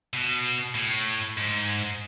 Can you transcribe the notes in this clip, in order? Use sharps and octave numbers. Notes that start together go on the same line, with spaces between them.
B2
A2
G#2